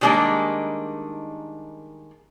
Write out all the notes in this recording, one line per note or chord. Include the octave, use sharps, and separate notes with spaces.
D#3 G3 G#3 A#3 D4 D#4